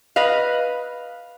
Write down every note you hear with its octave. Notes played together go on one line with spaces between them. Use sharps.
B4 D#5 F5